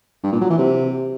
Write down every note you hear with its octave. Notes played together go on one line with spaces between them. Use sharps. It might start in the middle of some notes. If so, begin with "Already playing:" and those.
G2
A#2
F#3
E3
C3